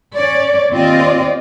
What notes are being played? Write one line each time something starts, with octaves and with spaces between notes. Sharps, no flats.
C#4 C#5 D5
D#2 C4 F4 D5 D#5